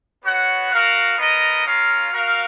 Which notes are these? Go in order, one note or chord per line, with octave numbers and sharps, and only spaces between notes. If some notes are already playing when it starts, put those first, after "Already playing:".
B3 F#4 C#5 F#5
F#4 A#4 F5
B3 D#4 A#4 D#5
C#4 F4 A#4 F5
F#4 A#4 F5